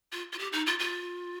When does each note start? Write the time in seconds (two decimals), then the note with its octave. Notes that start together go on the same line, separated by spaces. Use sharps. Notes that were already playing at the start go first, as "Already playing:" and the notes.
0.12 F4
0.33 F4
0.39 G4
0.52 D#4
0.67 F4
0.79 F4